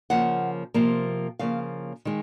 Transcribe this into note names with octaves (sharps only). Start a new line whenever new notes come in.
C#3 F3 A#3 F#5
C3 F3 A#3
C#3 F3 A#3 C#4 F5
D#3 G#3